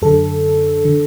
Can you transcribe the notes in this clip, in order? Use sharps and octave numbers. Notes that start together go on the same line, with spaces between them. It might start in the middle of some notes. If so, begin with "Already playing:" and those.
F#2 D3 A4
D3